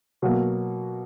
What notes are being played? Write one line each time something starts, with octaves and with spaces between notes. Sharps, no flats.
B2 F#3 A#3